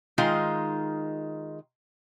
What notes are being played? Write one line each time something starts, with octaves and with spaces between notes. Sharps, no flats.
D#3 G#3 D#4 F4